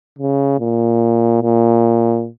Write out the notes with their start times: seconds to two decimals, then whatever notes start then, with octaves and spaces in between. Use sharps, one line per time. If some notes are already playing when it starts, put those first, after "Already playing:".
0.18 C#3
0.59 A#2
1.42 A#2